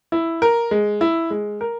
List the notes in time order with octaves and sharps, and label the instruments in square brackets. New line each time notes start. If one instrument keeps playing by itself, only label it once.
[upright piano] E4
A#4
G#3
E4
G#3
A#4